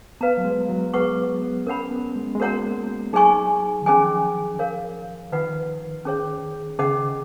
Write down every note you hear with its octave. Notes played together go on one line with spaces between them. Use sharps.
B3 B4 F5 A#5
F#3
G#3
F#3
B3 G#4 B4 F#5 C#6
B3
C#4 A#4 C#5 F#5 B5
B3
G#3
G#3
A#3 F#4 A#4 C#5 F#5 A#5
F#3 D#4 G#4 D#5 G#5 C#6
D#3
F3 C#4 G#4 D#5 G#5
A#4 C#5 F5
D#3 F4 B4 D#5 F#5
C#4 G#4 C#5
C#3 C#4 G#4 D#5 F#5